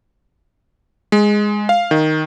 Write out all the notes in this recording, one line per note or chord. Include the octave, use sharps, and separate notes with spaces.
G#3
F5
D#3